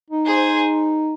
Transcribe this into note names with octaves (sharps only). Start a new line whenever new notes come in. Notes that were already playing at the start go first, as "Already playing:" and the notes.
D#4
G#4 C5